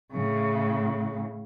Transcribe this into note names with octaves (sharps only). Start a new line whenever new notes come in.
A2 C#3